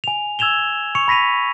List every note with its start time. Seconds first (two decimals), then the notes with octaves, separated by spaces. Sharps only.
0.04 G#5 F7
0.39 E6 G#6 E7 F7 G7
0.95 C#6 C#7 F7
1.08 B5 A#6 B6 D#7 F7